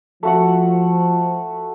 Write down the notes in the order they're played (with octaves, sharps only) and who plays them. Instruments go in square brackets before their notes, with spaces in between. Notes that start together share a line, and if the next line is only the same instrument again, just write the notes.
[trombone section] F3 [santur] A3 F#4 F#5